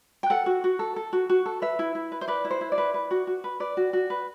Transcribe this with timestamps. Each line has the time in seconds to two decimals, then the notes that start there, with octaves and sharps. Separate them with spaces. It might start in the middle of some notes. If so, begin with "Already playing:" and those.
0.23 G5
0.30 A4 F#5
0.46 F#4
0.64 F#4
0.79 A4
0.96 A4
1.13 F#4
1.30 F#4
1.46 A4
1.62 B4 E5
1.79 E4
1.95 E4
2.12 B4
2.21 C5
2.28 B4 D5
2.45 E4
2.51 C5
2.61 E4
2.72 D5
2.78 B4
2.94 B4
3.11 F#4
3.27 F#4
3.44 B4
3.60 B4 D5
3.77 F#4
3.93 F#4
4.10 B4